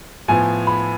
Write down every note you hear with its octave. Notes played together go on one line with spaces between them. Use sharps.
A2 F3 B3 G#5
B5